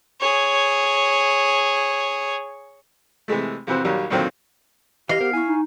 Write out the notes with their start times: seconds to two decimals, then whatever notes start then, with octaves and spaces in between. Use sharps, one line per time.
0.21 G#4 C#5
3.28 C3 E3 G#3 A3
3.67 F2 C3 E3 F#4 C5
3.85 A#1 D#2 F#3 G3 A#4
4.10 F#2 A#2 D3 D#3 F#3 C4
5.09 E3 G4 D#5 F5
5.21 B3 A#4 C5
5.33 E4 G#5 C#6
5.48 D#4